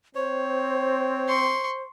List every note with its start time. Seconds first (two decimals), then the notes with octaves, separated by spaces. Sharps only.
0.15 C4 C5 C#5
1.28 C6 C#6